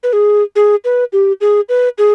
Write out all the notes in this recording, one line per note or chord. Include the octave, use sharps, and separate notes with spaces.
B4
G#4
G#4
B4
G4
G#4
B4
G#4